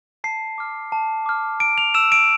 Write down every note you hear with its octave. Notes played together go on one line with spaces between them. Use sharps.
A5 C7
D6 F6
A5
D6 F6
A5 D7
F7
E6 E7
D7